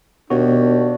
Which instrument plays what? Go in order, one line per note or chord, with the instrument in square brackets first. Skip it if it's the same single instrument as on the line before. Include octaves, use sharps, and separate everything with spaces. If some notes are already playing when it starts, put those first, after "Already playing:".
[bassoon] D#2 [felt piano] B2 [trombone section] D4 [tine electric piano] F#4